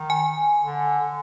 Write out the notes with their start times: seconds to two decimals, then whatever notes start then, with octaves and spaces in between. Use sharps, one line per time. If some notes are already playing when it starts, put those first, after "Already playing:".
Already playing: D#3
0.10 G#5
0.63 D3